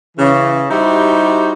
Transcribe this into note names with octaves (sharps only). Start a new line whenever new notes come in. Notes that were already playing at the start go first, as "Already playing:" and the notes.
C#3 E3
G3 D#4 E4 F#4 G4 C5